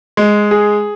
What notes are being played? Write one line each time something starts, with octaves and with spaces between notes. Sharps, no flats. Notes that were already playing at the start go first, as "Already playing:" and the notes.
G#3
G#4